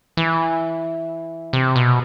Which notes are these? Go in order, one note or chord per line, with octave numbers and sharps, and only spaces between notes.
E3
C3
B2